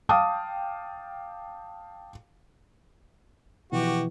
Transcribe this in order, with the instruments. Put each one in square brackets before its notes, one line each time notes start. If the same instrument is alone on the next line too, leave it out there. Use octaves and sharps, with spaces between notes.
[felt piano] F5 G5 A5 D6 D#6
[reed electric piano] B2 F3 [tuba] E3 [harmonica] F#4 G4